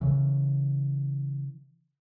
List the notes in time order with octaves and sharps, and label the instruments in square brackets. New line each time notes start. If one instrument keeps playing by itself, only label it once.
[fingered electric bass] C#3 E3